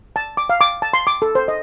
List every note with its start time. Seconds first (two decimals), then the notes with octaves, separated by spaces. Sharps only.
0.16 A5
0.37 D6
0.49 F5
0.61 D6
0.82 A5
0.93 C6
1.07 D6
1.22 A4
1.35 C5
1.48 D#5